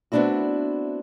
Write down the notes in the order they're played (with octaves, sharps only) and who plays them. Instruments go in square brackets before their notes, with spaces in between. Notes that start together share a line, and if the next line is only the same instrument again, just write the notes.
[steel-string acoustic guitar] A3 B3 C4 D4 E4 F#4